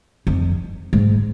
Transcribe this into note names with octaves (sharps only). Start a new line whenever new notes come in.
F2
G#2